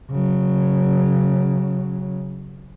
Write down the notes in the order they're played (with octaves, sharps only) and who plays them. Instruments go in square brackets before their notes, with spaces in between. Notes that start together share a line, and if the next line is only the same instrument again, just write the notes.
[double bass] C#3 F#3